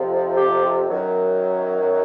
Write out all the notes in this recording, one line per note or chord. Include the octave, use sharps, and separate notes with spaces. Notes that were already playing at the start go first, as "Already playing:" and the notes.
Already playing: F2 C3 F3
G4
F#2 D#3 F#3